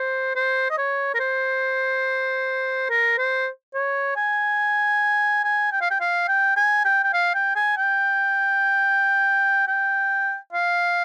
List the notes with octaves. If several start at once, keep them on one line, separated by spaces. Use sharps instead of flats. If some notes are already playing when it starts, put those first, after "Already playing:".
Already playing: C5
C5
D#5
C#5
A#4
C5
A#4
C5
C#5
G#5
G#5
G5
F5
G5
F5
G5
G#5
G5
G5
F5
G5
G#5
G5
G5
F5